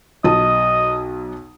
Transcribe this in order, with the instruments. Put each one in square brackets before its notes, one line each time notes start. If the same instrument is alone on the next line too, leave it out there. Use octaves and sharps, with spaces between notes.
[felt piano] B1 A5 D#6 [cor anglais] D#5